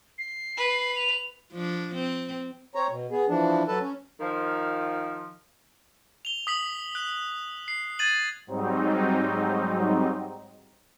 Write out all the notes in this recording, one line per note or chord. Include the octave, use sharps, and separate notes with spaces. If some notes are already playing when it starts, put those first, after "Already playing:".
C7
B4
F7
F3 D4
C4
C4 C#5 A#5
B2
B3 G#4
E3 F3 D4
F#3 A4 B4 A5
C#4
D#3 F3
F7 G7
D#6 B6 F#7
F#6
C7
G#6 A6 D#7 F#7
G#2 F#3 G3 C4 D#4